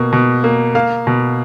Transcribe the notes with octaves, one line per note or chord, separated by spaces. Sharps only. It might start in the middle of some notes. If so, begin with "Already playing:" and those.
Already playing: B2 A#3
B2
A#3
A#3 F5
B2